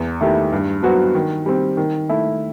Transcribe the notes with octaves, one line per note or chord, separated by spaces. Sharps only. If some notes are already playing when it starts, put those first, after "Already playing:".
Already playing: E2
D#3 A3 E4 G4
G2
F#3 B3 F#4 C5
D#3
G3 C4
D#3
A3 E4